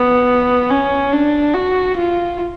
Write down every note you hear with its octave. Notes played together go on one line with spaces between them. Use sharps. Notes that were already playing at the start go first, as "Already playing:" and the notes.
Already playing: B3
C#4
D4
F#4
F4